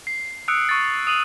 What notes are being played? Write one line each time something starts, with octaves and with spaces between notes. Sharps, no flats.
C7
D#6 E6 F#6 C#7 D7
C#6 A6
D#6 D7 D#7 F#7